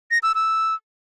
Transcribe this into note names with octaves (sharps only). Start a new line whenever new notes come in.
A#6
E6
E6